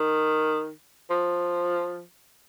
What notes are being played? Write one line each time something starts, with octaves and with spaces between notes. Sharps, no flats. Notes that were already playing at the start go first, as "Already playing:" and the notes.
Already playing: D#3
F3